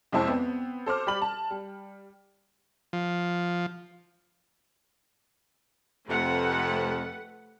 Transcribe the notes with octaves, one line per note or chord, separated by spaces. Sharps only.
C2 F2 G#3 E4 C5 A5
B3 C4
A4 C5 D6 F6
G3 G4 D5 B5 F#7
A5
G3
F3
F2 C3 A3 B4 F#5